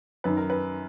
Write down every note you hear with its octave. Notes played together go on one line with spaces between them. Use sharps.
F#2 D#3 B4
A#4
B4